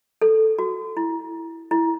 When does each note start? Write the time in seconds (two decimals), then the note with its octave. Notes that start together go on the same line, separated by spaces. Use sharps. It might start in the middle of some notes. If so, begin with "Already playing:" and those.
0.21 A4
0.59 F#4
0.97 E4
1.71 E4